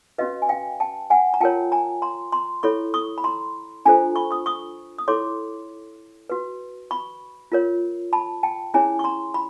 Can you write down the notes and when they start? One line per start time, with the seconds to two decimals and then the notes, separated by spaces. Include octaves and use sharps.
0.18 C#4 F#4 B4 D#5 F5
0.42 G#5
0.49 F5 G5
0.80 G5 A5
1.10 F#5 G#5
1.34 A#5
1.40 F4 A#4 C#5 G5 A5
1.72 G#5 A#5
2.02 A#5 C6
2.32 A#5 C6
2.63 E4 A4 C#5 B5 C#6
2.94 C#6 D#6
3.18 B5
3.24 A#5 C6
3.85 D4 F4 A4 C5 G#5 A#5
4.16 B5 C#6
4.31 C#6 D#6
4.46 C#6 D#6
4.99 D#6
5.08 E4 A4 C#5 C6 D6
6.30 F#4 B4
6.91 B5 C#6
7.52 F4 A#4 C#5
8.13 A5 B5
8.43 G5 A5
8.74 C#4 E4 G#4 C#5 G#5 A#5
8.99 C#6
9.04 A#5 C6
9.34 B5